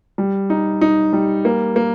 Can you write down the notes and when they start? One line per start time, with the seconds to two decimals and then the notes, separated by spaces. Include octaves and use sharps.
0.18 G3
0.50 D#4
0.81 D#4
1.13 G3
1.45 A#3
1.76 A#3